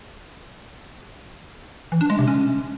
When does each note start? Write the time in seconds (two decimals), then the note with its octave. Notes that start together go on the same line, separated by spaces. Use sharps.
1.92 E3
2.01 D4
2.10 G#3
2.19 C3
2.28 C#4